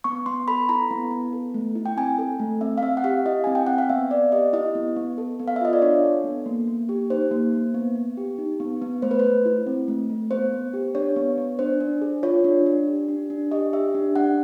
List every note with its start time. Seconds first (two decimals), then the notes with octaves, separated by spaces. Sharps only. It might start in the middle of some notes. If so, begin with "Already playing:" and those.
0.04 B3 C#6
0.26 B3 C6
0.48 A4 B5
0.69 E4 A#5
0.91 B3
1.11 B3
1.33 A4
1.54 A3
1.75 E4
1.86 G5
1.97 C4 G#5
2.19 A4
2.40 A3
2.61 C4 E5
2.78 F5
2.82 C4 E5
2.97 F#5
3.04 G4 F5
3.26 E4 D#5
3.44 C4 G#5
3.55 G5
3.67 C4 F#5
3.78 F5
3.89 B3 E5
4.11 B3 D5
4.32 G4 D#5
4.53 E4 D#5
4.75 B3
4.96 B3
5.18 A4
5.39 B3
5.48 F5
5.56 E5
5.61 F4 D#5
5.73 D5
5.82 D4 C#5
6.03 A4
6.24 B3
6.46 A#3
6.67 A#3
6.89 G4
7.10 D#4 C5
7.31 A#3
7.53 A#3
7.74 B3
7.96 B3
8.17 G4
8.38 D#4
8.60 B3
8.82 B3
9.02 A3 C5
9.11 B4
9.20 A3 C5
9.45 E4
9.67 C4
9.88 A3
10.10 A3
10.31 B3 C5
10.52 B3
10.73 G4
10.95 D4 C#5
11.16 B3
11.38 B3
11.59 D4 C5
11.80 D4
12.02 G#4
12.23 F4 C#5
12.44 D4
12.66 D4
12.87 G4
13.09 D4
13.30 D4
13.51 G4 D#5
13.73 G4 E5
13.95 D4
14.16 D4 F#5